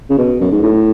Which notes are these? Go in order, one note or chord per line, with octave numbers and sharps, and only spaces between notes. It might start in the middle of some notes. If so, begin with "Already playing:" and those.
C#3
B2
F#2
G#2
A2